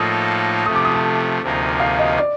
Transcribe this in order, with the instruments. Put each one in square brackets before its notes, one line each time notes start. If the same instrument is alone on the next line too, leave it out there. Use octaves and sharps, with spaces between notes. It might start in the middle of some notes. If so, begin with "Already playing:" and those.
Already playing: [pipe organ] A2 F3 A#3 D#4 A4 [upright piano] D#6
[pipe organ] C3 F3 A3 [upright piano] D#6
[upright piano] D6
D#6
A5
[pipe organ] D2 C3 F3 A#3 D#4
[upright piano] F5
D#5
D5